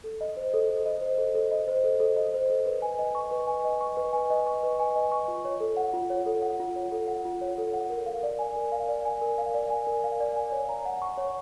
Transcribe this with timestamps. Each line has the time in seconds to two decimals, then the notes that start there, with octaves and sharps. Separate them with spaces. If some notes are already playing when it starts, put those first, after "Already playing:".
0.04 A4
0.21 D#5
0.37 C5
0.54 A4
0.70 A4
0.86 D#5
1.02 C5
1.18 A4
1.35 A4
1.51 D#5
1.68 C5
1.84 A4
2.00 A4
2.17 D#5
2.34 C5
2.50 A4
2.66 B4
2.82 G#5
2.99 D#5
3.15 C#6
3.31 B4
3.47 G#5
3.65 D#5
3.81 C#6
3.97 B4
4.13 G#5
4.30 D#5
4.47 C#6
4.63 B4
4.80 G#5
4.96 D#5
5.12 C#6
5.28 F4
5.45 C#5
5.60 A4
5.77 F#5
5.94 F4
6.10 C#5
6.26 A4
6.42 F#5
6.60 F4
6.76 C#5
6.92 A4
7.08 F#5
7.25 F4
7.41 C#5
7.58 A4
7.74 F#5
7.90 A#4
8.06 F5
8.23 D5
8.39 G#5
8.56 A#4
8.72 F5
8.89 D5
9.05 G#5
9.21 A#4
9.38 F5
9.54 D5
9.70 G#5
9.87 A#4
10.04 F5
10.20 D5
10.36 G#5
10.52 C#5
10.69 A#5
10.85 F#5
11.02 C#6
11.17 C#5